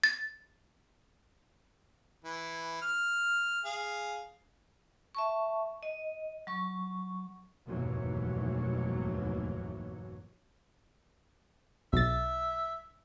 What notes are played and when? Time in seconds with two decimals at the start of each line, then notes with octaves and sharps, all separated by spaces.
0.04 A6
2.24 E3
2.82 F6
3.65 G#4 F5
5.15 E5 A5 C#6
5.83 D#5
6.47 F#3 C#6
7.67 F1 D#2 G#2 B2 E3 F#3
11.93 B1 E5 A6